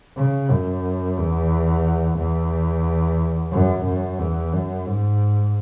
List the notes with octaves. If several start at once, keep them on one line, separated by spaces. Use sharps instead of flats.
C#3
F#2
E2
E2
F#2
F#2
E2
F#2
G#2